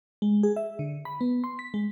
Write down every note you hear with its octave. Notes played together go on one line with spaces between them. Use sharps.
G#3
G#4
E5
D3
B5
B3
C6
B6
G#3